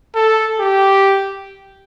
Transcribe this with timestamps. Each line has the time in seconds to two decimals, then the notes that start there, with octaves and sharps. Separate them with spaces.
0.15 A4
0.59 G4